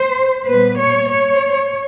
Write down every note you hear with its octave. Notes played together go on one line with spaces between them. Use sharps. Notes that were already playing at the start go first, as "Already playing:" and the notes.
Already playing: C5
A#2 G3 B3 B4
C#5
C#5